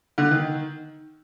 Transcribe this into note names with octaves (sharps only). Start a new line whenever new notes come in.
D3
D#3